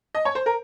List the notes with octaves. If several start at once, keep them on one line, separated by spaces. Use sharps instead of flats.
D#5
C#5
C5
A#4